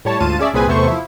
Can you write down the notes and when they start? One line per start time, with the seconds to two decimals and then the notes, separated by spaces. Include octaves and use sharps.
0.05 A2 G3 C#5 A5
0.20 D2 G#2 F4 A5 D#7
0.39 C#4 G#4 D5 E5
0.54 C2 A#2 C4 G#4 B4 G#5
0.67 E2 C3 A3 B3 C5 C#6
0.88 F3 E4